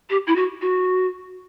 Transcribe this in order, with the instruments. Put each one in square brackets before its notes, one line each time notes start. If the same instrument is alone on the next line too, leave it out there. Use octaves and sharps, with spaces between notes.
[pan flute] G4
E4
F#4
F#4